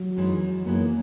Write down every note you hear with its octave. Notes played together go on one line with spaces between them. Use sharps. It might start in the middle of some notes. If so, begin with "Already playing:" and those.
Already playing: F#3
F#2 E3 G#3 B3 D#4
F#2 E3 G#3 A#3 B3 D#4